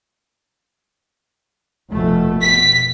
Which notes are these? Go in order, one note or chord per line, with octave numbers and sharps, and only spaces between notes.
F1 B2 A3
B2 B6